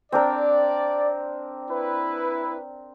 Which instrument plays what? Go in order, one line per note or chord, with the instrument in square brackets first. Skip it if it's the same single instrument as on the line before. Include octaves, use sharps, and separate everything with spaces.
[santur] C4 D4 A#4 [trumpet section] D5
[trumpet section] E4 B4